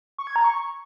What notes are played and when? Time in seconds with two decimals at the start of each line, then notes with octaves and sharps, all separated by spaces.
0.18 C#6
0.27 G#6
0.36 A#5
0.44 C#6